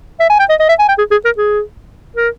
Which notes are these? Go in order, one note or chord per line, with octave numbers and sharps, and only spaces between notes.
E5
G#5
G5
D#5
D#5
E5
G#5
G5
G#4
G#4
A#4
G#4
A#4